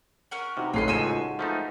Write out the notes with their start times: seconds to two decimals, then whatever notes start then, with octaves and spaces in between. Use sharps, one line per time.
0.31 C#4 A#4 F#5
0.57 C3 D#4 F#4 B4
0.73 A1 F4 G#4 A4 B4 D#5 C7
0.88 C#2 F3 G#5 C#6 E6 C7 D#7 E7
1.09 G#3
1.39 F3 A3 D#4 B4